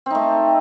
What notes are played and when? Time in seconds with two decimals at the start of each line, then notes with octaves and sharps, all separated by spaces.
0.06 C4
0.10 D#4
0.15 A3